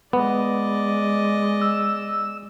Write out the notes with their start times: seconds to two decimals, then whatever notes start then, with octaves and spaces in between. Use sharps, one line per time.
0.13 G#3 B3 D5 D#5
1.61 E6